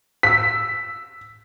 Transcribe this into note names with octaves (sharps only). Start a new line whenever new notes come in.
E6 B6